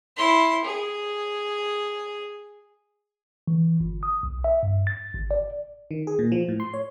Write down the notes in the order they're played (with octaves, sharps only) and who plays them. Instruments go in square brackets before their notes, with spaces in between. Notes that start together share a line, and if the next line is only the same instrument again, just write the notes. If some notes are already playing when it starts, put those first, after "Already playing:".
[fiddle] E4 C6
G#4
[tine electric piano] E3
G1
D#6
B1
E5
G2
A6
G#1
D5
[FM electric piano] D#3
G#4
A#2
F3
A2
C6
C#5